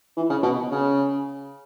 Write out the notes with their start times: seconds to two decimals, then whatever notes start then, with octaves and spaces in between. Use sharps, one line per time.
0.17 E3
0.30 C#3
0.43 B2
0.71 C#3